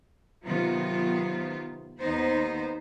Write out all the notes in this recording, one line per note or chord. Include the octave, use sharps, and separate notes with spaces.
C3 D#3 F#3 B3 F4
D#2 B3 D#4 C5